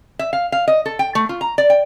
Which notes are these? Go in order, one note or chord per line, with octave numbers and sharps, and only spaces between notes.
E5
F5
F5
D#5
A4
G5
A3
F4
A#5
D5
G5